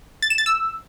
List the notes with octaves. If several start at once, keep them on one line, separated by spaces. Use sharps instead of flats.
A6
E7
A6
E6